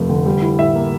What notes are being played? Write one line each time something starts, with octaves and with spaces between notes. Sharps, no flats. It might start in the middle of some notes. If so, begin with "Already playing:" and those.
Already playing: F1 F2 A3
D3
G3
E4
A2 E5
A#3